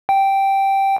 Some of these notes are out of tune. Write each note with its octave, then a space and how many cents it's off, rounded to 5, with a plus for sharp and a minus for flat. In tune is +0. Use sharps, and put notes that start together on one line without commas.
G5 -5